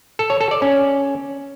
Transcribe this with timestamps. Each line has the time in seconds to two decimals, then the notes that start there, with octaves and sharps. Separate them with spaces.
0.19 A4
0.30 C#5
0.41 A4
0.51 D5
0.62 C#4